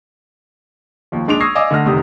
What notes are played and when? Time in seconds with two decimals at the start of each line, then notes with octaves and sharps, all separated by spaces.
1.12 D#2 F3
1.28 A#1 G#3 D4 C6 D7 F7
1.40 C#6 D#6 E6 G#6 A#6 C7
1.55 D5 D#5 F5 G#5 D6 E6
1.71 D3 A3 F#5 F6 A#6
1.86 F1 C3 D#3 G4 D#6